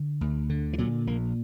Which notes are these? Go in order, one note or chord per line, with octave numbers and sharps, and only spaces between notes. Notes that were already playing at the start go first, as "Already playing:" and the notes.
Already playing: D3
D2
D3
E3
A#2 F#3
A#1 A#3